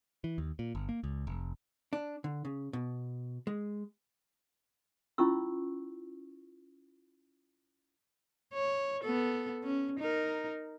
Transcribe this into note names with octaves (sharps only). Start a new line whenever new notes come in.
E3
D#2
A#2
G1
A#3
C#2
F1
D4
D3
C#3
B2
G#3
C#4 E4 F4 C#6 E6
C#5
B3 A4
C#4
D#4 A#4